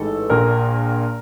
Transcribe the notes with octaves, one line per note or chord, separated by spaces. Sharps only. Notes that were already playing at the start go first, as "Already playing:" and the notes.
Already playing: A1 G#2 E3 A4
A#1 A#2 A#4